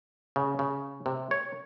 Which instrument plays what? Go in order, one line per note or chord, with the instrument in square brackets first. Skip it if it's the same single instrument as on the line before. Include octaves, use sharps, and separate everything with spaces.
[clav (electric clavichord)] C#3
C#3
C3
C#5